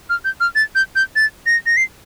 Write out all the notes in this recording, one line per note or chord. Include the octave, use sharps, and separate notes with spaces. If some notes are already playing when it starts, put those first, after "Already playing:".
F6
G6
F6
A6
G6
G6
A6
A#6
A#6
C7